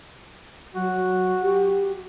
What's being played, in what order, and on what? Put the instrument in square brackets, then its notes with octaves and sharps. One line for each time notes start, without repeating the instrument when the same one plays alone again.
[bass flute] F#3 [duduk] F#4
[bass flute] G4